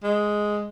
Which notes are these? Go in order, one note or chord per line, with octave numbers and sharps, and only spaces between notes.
G#3